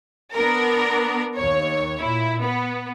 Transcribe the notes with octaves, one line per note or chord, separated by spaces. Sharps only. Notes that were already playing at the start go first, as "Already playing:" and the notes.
B3 D4 A#4
D#2 C#5
A#2 E4
B3